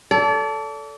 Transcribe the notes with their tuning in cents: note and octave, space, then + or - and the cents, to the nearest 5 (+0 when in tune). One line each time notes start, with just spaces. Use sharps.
A4 +0 D5 -35